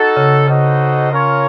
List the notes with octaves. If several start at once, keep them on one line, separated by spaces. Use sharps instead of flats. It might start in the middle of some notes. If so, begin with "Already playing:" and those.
Already playing: D#4 F#4 A4
C#3
C#3 D#4 F#4 A4 C5 D#5
C#4 F4 A#4 C#5